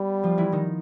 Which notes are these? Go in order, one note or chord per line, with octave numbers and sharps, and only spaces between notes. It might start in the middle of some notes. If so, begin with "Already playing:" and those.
Already playing: G3 B3 B4
F3 F4
E3 E4
D#3 D#4